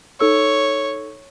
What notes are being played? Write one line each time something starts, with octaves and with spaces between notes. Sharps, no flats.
D#4 A4 C#5 E6